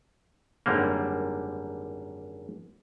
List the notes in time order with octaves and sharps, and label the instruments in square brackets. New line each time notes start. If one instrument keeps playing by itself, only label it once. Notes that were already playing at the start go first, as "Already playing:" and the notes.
[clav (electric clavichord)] G#1 F#2 D3 G3 A#3